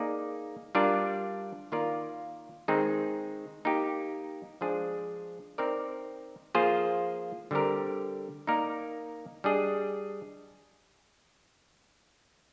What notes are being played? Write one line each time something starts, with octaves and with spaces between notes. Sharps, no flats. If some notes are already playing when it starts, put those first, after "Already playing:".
Already playing: A#3 D#4 G#4 D5
G3 D4 F4 A#4 D5
D#3 A#3 F4 A#4 D5
D#3 G#3 C4 D#4 G#4
A#3 D#4 G4
F3 G#3 D4 G#4 C5
C4 D#4 A#4 D5
F3 A#3 F4 G#4 C5
D3 G3 C4 G4 A#4
A#3 D#4 A#4 D5
G3 D4 G#4 D#5